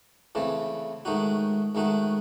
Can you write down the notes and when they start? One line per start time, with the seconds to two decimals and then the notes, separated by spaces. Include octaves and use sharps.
0.35 C#3 E3 A3 C4
1.05 G#2 D#3 A3 D#4 F#4
1.75 G#2 D#3 A3 D#4 F#4